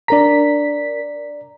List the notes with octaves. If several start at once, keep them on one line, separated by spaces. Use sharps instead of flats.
D4 A#4 D5 A#5 B6